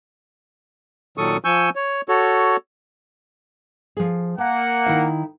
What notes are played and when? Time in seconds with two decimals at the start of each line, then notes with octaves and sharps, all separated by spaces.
1.18 A#2 D#3 F#3 A4 C#6 D#6
1.45 F3 G#5 C#6 E6 G6
1.76 C#5
2.09 F#4 A4 C#5
3.97 F3 G#4
4.38 A#3 F#5 A5
4.86 D#3 E4 F5